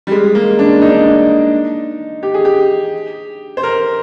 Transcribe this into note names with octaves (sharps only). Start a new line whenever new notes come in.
G3
G#3
A#3
D4
D#4
D4
D#4
G4
G#4
G4
C5
A#4